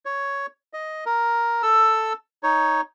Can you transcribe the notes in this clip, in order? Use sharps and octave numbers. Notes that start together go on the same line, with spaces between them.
C#5
D#5
A#4
A4 E6
D#4 C#5